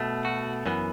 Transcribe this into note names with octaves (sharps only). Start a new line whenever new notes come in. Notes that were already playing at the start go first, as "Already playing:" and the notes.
Already playing: B2 A3
F#4
F#2 E3 B3